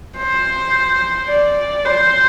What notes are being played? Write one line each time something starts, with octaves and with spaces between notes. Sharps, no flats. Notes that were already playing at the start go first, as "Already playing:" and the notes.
C5
D5
C5